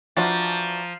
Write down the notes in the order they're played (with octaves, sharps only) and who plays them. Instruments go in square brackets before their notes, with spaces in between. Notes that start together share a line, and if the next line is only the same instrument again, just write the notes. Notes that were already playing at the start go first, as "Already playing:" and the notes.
[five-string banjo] E3 D4 F#4 [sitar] F3 [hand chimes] A#5 A6